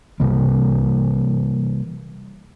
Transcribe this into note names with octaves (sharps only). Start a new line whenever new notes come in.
C3 E3 G3 A#3